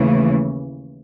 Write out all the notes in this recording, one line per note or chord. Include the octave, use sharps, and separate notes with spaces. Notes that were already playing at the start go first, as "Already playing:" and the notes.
Already playing: D#2 C#3 E3 A3